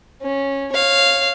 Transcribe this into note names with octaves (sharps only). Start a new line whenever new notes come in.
C#4
C#5 F5